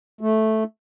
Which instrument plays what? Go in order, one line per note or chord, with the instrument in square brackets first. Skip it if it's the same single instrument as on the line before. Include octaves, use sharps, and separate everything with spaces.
[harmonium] A3